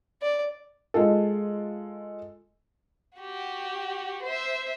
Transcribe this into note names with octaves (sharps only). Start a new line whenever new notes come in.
D5
G#3 F4 A4
F#4 G4
C5 E5